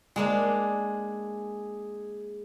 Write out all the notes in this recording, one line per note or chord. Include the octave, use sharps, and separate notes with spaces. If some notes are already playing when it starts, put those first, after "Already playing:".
G#3 A#3 D4 G#4